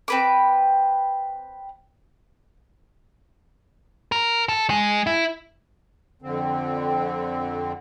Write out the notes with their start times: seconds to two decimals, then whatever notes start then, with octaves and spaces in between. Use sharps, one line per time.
0.08 C4 B4 D6
4.12 A#4
4.49 A4
4.70 G#3
5.07 E4
6.22 F2 D3 C4